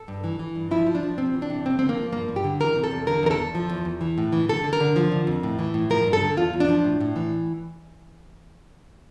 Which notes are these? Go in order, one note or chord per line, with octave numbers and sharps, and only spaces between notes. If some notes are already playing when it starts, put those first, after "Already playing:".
Already playing: A4
G2
E3
E3
G2
F3 E4
F3
D4
F3
C3 C4
E3
D4
C3
F2 C4
D3 C4
A#3
F3
G2 A#3
G2
G4
D3
E3 A#4
C3
A4
E2
D3 A#4
E2 A#4
A4
E2
F3
E2
E2
E3
A2
E3
D3 A4
D3
A#4
D3
F3
D3
F2
A2
E3
A2
F3 A#4
G2
A4
D3
E2 F4
E2
D4
F3
A2
A2
E3